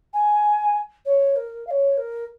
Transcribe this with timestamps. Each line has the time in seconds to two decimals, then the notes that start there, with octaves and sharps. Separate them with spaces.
0.13 G#5
1.05 C#5
1.36 A#4
1.67 F5
1.70 C#5
1.97 A#4